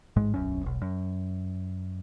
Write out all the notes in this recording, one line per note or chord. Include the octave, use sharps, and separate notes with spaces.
A1 G#2 G#3
D1 B1 F#2 C#4
E1 B1
F#2